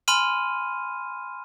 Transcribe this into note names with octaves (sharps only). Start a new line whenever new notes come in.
G#5 B5 C6 F6 D#7